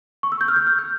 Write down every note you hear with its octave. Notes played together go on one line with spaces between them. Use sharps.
C#6
E6
G6
F6
G6
F6
G6